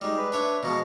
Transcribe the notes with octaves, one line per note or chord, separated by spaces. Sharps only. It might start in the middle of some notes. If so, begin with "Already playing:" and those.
G3 G#3 D#4 F#4 D#5
B4
D4 C#5 E5
B2 F3 G#3 A#5 C#6